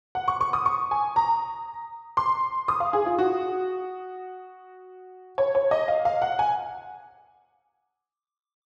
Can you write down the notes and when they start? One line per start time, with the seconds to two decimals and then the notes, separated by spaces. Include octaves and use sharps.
0.15 F#5
0.28 C#6
0.41 C#6
0.53 D#6
0.66 C#6
0.91 G#5
1.16 A#5
2.17 C6
2.68 D#6
2.80 F5
2.93 G#4
3.06 F4
3.18 F#4
5.38 C#5
5.55 C#5
5.71 D#5
5.88 F5
6.05 F5
6.22 F#5
6.39 G#5